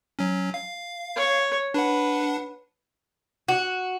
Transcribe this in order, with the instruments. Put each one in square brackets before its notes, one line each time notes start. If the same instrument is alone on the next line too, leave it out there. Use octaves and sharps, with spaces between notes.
[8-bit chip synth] F#3 C#4
F5
[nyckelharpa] C#5
[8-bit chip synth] D4 F#5 [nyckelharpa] B4
[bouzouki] F#4